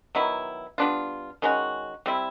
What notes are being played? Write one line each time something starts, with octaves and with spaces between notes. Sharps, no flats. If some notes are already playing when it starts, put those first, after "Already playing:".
D#3 F#3 B3 E4
G3 B3 D4 F4
D#3 G#3 C#4 F#4
G3 C4 E4